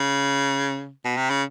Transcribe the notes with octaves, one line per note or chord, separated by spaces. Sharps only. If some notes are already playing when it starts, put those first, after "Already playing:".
Already playing: C#3
B2
C3
C#3